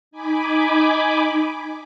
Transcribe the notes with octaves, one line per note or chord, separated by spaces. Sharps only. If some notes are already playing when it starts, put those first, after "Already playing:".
D#4 G#5 B5 D6